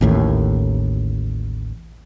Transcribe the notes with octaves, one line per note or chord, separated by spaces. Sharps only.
A1 D#2 A2